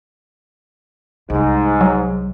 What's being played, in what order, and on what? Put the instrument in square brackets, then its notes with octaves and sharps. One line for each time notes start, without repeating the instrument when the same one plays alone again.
[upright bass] C2 [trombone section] G#2
[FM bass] F#3